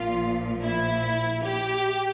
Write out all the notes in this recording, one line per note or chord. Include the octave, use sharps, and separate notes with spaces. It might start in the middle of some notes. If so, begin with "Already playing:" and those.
Already playing: A#1 A#2 F3 F4
E4
G4